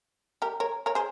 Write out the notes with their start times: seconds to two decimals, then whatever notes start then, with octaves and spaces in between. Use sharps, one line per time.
0.42 G4 A#4
0.60 A#4 C#5
0.86 A#4 C#5
0.95 G#4 C5